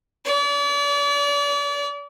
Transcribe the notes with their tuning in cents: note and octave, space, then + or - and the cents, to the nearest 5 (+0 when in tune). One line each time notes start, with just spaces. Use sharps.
D5 -40